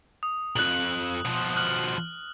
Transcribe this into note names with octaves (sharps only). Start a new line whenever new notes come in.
D#6
B1 F2 F#6 F#7
B2 F3
F6 F#6 F#7